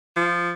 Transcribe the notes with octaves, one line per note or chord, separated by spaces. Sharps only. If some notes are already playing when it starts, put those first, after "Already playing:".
F3